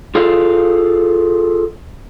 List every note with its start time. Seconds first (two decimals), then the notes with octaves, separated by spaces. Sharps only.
0.15 F4 G#4 A4 F5